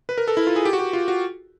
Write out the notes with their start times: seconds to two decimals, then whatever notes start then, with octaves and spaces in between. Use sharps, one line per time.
0.09 B4
0.18 A#4
0.28 A4
0.37 E4
0.47 F4
0.56 G#4
0.65 G4
0.73 F#4
0.79 G4
0.93 F4
1.08 F#4